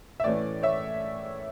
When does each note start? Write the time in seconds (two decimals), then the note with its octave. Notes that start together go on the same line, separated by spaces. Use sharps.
0.20 E5
0.24 A2 E3 A3 C#4 D5
0.63 C#5 E5